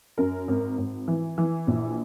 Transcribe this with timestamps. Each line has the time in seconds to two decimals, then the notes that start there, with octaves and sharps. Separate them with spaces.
0.18 F#2 A#4
0.48 G#1
0.78 G#1
1.08 E3
1.38 E3
1.67 A#1